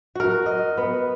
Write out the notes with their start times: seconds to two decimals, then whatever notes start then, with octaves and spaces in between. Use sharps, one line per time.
0.15 F#4 A#4
0.46 D#5
0.77 B3